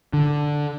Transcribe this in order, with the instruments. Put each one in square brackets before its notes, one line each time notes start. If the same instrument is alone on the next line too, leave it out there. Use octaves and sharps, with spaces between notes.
[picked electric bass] D3